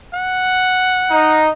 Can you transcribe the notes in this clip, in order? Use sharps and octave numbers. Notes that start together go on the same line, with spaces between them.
F#5
D#4